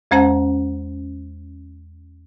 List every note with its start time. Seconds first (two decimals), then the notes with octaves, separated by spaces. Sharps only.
0.11 E2 G#3 C#4 C5 F#5 A5